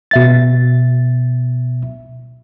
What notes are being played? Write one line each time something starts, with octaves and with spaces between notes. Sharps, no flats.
B2 E5 A6